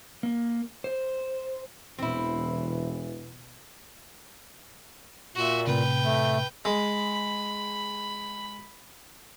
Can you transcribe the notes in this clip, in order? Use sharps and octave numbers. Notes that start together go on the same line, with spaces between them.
A#3
C5
E1 B2 E3 C4 E4
A#2 F#4 E5
A2 C3 B4 G5
A3
G#3 B5